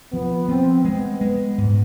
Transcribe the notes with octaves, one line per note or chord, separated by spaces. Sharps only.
F3 B3
F3 C4
G#3 B3
G#3
G#2